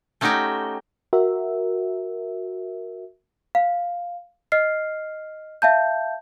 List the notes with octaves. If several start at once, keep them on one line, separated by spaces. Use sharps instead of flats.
A3 C#4 D#4 F#4 G4 G5
F#4 A#4 E5
F5
D#5 F6 C7
E5 F5 A5 G6